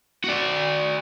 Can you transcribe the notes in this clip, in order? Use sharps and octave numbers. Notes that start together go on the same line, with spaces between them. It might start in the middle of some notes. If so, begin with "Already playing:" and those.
F#4 D5